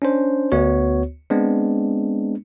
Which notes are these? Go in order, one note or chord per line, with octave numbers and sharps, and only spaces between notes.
C#4 D4 C5
D2 B3 F#4 C#5
G#3 B3 C4 D4